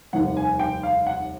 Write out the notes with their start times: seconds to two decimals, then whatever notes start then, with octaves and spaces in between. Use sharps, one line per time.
0.13 F1 D#2 D#3 G3 F#5
0.37 G#5
0.59 G5
0.83 F5
1.07 F#5